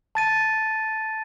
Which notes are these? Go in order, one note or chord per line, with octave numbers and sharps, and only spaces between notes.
A5 A6 D#7